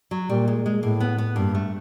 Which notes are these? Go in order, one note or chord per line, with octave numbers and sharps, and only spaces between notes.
F#3
A#2 G3
G#3
G#3
A2 A#3
B3
B3
G2 A#3
A3